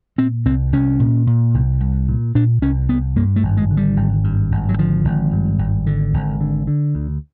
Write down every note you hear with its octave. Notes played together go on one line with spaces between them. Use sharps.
A#2 C4
C2 C4
C2 C#4
A#2
A#2
C2
C2
A#2
A#2 D4
C2 C#4
C2 B3
G2 A#3
A3
G#1
G#3
D3
G3
G#1
G2
G#1
F#3
D3 F3
G#1
G2
G#1
D3
G#1
D3
D3
D2